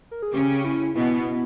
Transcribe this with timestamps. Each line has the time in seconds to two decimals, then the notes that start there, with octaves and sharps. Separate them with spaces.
0.11 A#4
0.23 G#4
0.33 C#3 C#4 G4
0.60 G4
0.65 E4
0.95 B2 B3 E4